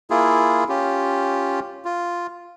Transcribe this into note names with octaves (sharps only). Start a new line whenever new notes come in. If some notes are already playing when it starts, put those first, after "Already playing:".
A#3 E4 F4 G#4
C#4 F4 G4
F4